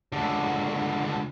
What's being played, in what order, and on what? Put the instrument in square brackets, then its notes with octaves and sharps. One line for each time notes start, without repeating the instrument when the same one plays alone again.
[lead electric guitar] C#2 D3